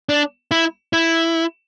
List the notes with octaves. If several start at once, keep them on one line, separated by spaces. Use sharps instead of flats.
D4
E4
E4